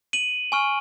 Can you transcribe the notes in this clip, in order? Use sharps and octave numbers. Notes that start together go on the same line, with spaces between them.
D#7 F#7
G#5 C#6 F6